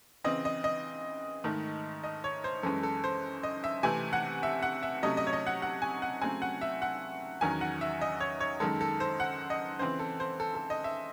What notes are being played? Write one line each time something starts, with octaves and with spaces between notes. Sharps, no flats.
C#3 E3 C4 D#5
D#5
D#5
G#2 D#3 A3
D#5
C#5
C5
F#2 E3 G#3 C#4 A4
A4
C5
D#5
E5
C3 E3 A3 C4 G#5
F#5
E5
F#5
E5
C3 F#3 A3 C#4 D#5
D#5
C#5
D#5
F#5
F#5
G#5
F#5
C#3 F#3 A3 C4 G#5
F#5
E5
F#5
E2 D#3 F#3 C#4 G#5
F#5
E5
D#5
C#5
C#5
F#2 D#3 G#3 A4
A4
C5
F#5
D#5
C#3 E3 C4 C5
A4
C5
A4
A4
D#5
E5